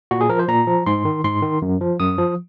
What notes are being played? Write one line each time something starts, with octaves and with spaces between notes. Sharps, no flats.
A#2 F#4
G#4
F3 A#4
C5
A#2 A#5
F3
G#2 C6
D#3
G#2 C6
D#3
F#2
F3
F#2 D#6
F3